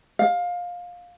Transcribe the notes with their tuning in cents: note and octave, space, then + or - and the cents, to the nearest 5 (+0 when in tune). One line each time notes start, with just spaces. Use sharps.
F5 +20